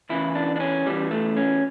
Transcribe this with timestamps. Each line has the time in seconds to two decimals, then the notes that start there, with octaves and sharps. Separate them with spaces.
0.09 E2 C#3 E3 E4
0.35 D4
0.56 D4
0.60 C#4
0.86 E2 C#3 E3 G3
1.11 A3
1.37 C#4